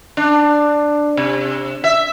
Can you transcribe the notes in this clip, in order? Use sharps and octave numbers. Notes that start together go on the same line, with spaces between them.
D4
C3
E5